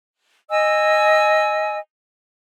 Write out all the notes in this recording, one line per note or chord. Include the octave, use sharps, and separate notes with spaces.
D#5 G#5 E6